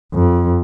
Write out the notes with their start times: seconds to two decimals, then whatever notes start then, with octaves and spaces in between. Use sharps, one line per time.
0.14 F2